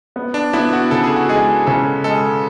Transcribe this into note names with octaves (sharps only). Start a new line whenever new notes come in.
B3
D4
B3 E4
F#4
C#3 A4
G#4
F#4
G#3 G#4
C#3 A4
G#3 A4